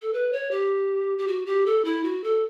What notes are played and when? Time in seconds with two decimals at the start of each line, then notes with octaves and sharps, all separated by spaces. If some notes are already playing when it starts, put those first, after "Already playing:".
0.02 A4
0.13 B4
0.33 C#5
0.51 G4
1.18 G4
1.28 F#4
1.46 G4
1.66 A4
1.85 E4
2.04 F#4
2.24 A4